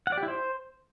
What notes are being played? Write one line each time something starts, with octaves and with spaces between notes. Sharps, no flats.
F#5
D5
G4
E4
C5